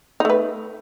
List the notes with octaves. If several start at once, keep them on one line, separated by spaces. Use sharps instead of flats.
A3 D#4 B4